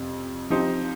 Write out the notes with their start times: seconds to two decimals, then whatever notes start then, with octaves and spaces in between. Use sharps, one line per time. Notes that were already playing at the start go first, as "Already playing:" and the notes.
Already playing: F2 C3 G3 C4
0.50 F3 C4 D#4 G4 C5